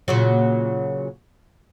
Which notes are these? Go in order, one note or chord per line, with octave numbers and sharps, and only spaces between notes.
A#2 C#3 F#3